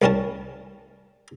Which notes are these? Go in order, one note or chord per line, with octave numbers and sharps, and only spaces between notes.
C2 G3 C#4 A#4 A5